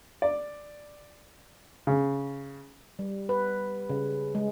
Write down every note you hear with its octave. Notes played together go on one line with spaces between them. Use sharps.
D5
C#3
G3
B4
C#3
G#3